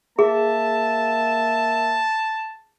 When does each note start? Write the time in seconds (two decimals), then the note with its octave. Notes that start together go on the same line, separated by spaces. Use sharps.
0.19 A#3 G#4 E5 A5